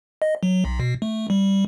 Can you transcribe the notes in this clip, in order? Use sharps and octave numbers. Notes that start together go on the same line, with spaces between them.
D#5
F#3
B1
B2
A3
G3